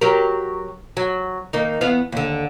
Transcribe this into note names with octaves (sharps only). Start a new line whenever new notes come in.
F#3 G4 A#4
F#3
D#3 A#3 D#4
E2 B3 F5
D#2 D3